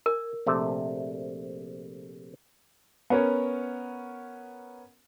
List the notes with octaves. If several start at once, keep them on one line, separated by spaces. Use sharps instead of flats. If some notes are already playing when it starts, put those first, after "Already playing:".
A#4 G#5
A#1 C3 A3
B3 C#4 A#4 C#5